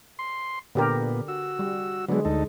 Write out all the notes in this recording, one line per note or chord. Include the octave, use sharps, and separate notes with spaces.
C6
A#2 D3 B3 G4 A#4
F#4 E6
G3
D3 F#3 G#3 B3 D4
D2 D#4 A4